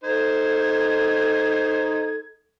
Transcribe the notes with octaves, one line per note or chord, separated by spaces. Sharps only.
D#4 A4 C5 G#6